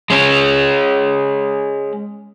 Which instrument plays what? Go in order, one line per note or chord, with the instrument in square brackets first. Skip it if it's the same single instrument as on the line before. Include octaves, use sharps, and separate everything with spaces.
[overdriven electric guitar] G#3 C#4